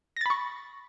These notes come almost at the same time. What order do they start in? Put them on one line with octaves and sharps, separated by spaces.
A#6 A6 B5 C#6